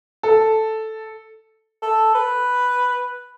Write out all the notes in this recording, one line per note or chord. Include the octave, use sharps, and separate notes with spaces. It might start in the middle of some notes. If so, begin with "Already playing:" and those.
A4
A4
B4